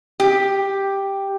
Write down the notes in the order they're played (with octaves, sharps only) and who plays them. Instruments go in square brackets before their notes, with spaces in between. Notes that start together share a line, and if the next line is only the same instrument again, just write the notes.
[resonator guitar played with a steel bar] G4